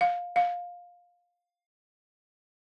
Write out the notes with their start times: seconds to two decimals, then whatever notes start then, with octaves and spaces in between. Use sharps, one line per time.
0.01 F5
0.36 F5